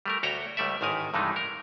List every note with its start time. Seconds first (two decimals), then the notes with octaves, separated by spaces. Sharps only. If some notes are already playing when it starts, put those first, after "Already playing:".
0.06 G3 A3 A#4
0.23 D2 F#4 C#5 G5 A#5
0.57 C#2 G3 A3 D5 E5
0.81 A1 G#2 D#3 A#4 G#5
1.14 G2 C3 E3 G#3 A3 D#4
1.36 A#4